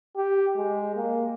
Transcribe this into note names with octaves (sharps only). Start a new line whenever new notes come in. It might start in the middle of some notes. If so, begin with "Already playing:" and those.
G4
G#3
A#3